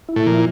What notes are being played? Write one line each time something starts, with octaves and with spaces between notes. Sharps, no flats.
E4
A2
A#2 F3